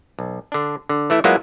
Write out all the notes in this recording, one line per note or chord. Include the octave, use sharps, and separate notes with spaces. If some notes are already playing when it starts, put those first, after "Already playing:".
B1
D3 D4
D3
E3 A3 E4
F#3 G#3 A#3 B3 E4 F4